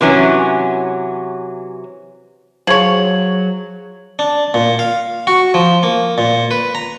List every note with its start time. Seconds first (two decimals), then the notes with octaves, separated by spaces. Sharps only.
0.01 C3 E3 F#3 C#4
2.67 F3 F#3 G#4 C#5 G#6 F#7
4.19 D4
4.54 A#2
4.79 F5
5.27 F#4
5.54 F3
5.83 A#3
6.18 A#2
6.51 B4
6.75 A#5